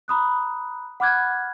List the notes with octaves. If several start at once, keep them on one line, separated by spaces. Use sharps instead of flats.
A#5 B5 D#6 F#6
F#5 B5 D6 F6 F#6 G#6